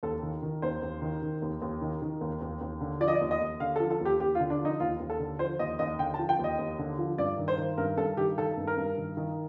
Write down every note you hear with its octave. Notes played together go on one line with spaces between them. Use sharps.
D#2 A4
D#3
D#3
D#2 C5
D#2
D#3
D#3
D#2
D#2
D#3
D#3
D#2
D#2
D#2
D3
F3 D5
D#5
D5
D#2
D#5
D#2
D3 F5
A4
F3
A4
D#2
G4
D#2 G4
F4
D3
D4
F3
D#4
D#2 F4
D#2
A4
D3
F3 C5
D#2 D#5
D#2 D#5
D3 G5
A5
F3
G5
D#2
D#5
D#2
D3
F3
G2 D5
D#3
C5
D#3
G2 A#4
G2 A4
D#3 G4
D#3 A4
G2
A#4
G2
D#3
D#3